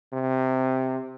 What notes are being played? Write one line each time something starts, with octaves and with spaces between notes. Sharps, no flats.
C3